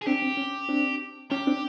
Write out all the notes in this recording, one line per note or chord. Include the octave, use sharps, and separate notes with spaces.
G#4
C4 D4 G4
C4
C#4
C4 D4
C#4 G4
C4 D4